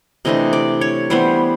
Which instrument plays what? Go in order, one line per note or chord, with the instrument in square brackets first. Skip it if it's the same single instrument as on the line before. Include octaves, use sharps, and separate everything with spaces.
[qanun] C3 E3 A3 D4 D#5
D5
C#5
E3 G3 B3 C5